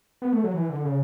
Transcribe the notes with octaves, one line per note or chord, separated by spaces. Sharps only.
B3
A3
F#3
E3
D3
C#3